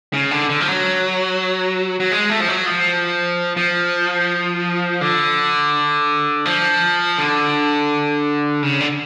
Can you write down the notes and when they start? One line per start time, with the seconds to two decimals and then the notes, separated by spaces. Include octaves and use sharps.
0.13 C#3
0.31 D3
0.49 D3
0.61 F3
0.68 F#3
2.00 F#3
2.12 G#3
2.30 A3
2.40 F3
2.48 F#3
2.66 F3
3.57 F3
5.01 D3
6.45 F3
7.18 D3
8.63 C#3
8.80 D3